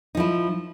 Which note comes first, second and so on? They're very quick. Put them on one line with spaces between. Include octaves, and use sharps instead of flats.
D#4 F3 E4